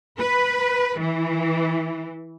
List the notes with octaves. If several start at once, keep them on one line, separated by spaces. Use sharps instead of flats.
B4
E3